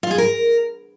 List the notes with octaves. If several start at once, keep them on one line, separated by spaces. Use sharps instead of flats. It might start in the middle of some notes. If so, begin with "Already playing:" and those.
F4
G#4
A#4